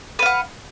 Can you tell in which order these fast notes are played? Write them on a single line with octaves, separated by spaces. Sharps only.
B4 F5 F#5